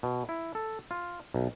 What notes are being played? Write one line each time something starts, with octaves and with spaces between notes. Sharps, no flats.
B2
E4
A4
F4
B1